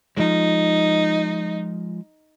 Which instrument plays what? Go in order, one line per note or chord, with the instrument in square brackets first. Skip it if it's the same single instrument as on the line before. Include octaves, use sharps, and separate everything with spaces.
[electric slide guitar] F3 G#3 [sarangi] D#4